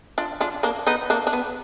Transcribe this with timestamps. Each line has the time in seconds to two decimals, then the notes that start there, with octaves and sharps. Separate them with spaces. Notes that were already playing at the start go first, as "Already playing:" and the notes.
0.18 D4 F4
0.41 D4 F4
0.63 A#3 D4
0.87 B3 D#4
1.10 A#3 D4
1.27 D4
1.33 B3